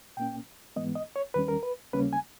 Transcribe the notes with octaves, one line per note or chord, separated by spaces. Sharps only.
A#2 A#3 C#4 G5
G#2 E3 G#3 B3 D#5
D#5
C#5
D#2 D#3 G3 C#4 B4
A#4
B4
D#2 C#3 G3 A#3 C#4 B4
G#5